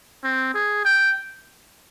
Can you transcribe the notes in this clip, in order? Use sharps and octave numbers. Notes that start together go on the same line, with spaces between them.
C4
G#4
G5